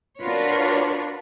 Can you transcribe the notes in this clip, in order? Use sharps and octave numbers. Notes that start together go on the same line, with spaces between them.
D4 F4 F#4 A#4 B4 C#5